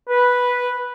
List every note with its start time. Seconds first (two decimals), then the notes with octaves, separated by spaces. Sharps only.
0.10 B4